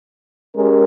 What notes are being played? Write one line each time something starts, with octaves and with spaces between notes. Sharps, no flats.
G#3 C#4 G4 A#4